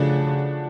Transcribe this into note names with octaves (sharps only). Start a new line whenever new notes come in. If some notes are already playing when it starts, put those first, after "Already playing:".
Already playing: C#3 F3 A3 D4 F#4